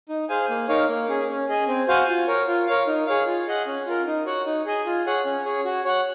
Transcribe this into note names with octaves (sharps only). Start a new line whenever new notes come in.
D#4
G#4 C5 F5 G#5
A#3
D#4 A#4 C#5 F5
A#3
C#4 G#4
C#4
G#4 D#5 G#5
C4
F#4 C5 F5 G#5
F4
A#4 C#5
F4
A#4 C#5 F5
D#4
G#4 C#5 F5
F4
G#4 D#5 F#5
C#4
F4 A#4
D#4
F#4 C#5 F#5
D#4
G#4 D#5 G#5
F4
G#4 C#5 F#5
C#4
G#4 C#5
F#4
C#5 F#5